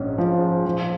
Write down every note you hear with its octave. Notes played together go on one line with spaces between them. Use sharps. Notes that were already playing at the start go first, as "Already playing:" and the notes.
Already playing: A#1 G#2 C#4
F3
F3